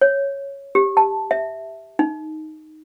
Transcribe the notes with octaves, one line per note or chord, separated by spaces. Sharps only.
C#5
G4
A5
E5
D#4